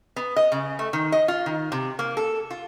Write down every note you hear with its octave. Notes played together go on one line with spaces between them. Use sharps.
B3
D#5
C#3
A3
D#3
D#5
F4
D#3
C3
A#3
A4
F4